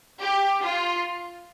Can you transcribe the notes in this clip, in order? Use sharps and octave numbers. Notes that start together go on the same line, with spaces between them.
G4
F4